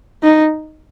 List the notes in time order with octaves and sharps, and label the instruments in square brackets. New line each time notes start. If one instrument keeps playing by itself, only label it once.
[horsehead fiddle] D#4